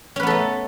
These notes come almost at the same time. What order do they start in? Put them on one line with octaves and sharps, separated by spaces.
C#4 B4 B3 A4 A3